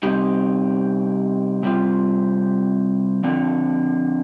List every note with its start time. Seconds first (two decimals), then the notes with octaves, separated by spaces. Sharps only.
0.03 C3 G3 C4 D#4 G4
1.63 C3 G3 C4 F4
3.23 D3 F3 C4